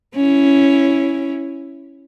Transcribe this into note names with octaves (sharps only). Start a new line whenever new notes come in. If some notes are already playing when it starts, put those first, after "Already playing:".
C#4 E4